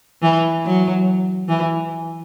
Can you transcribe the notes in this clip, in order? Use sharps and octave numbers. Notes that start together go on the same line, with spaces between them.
E3
F#3
E3